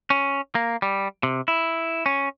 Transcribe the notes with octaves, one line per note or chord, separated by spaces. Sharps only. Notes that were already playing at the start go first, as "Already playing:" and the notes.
C#4
A#3
G3
C3
E4
C#4